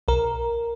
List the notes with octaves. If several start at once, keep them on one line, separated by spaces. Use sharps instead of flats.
B1 A#4